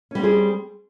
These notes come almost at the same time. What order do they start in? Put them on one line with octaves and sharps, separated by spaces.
C#4 G3 C4 G#4